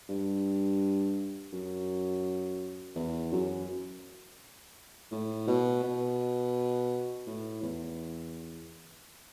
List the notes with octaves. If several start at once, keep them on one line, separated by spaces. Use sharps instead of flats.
G2
F#2
E2
F#2
A2
B2
B2
A2
E2